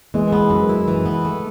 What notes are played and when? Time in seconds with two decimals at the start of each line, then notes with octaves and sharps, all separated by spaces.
0.14 E3 G#3
0.32 B3
0.50 F#2
0.69 E4
0.88 E3
1.06 B3
1.25 A3